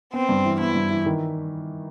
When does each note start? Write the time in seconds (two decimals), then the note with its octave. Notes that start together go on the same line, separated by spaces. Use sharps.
0.14 B3 C4
0.29 G2
0.44 E3
0.60 B3 E4
0.75 G2
0.90 E3
1.06 D#3